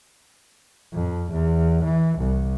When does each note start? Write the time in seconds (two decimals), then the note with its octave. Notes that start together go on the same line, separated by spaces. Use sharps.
0.93 F2
1.31 E2
1.84 E3
2.19 C2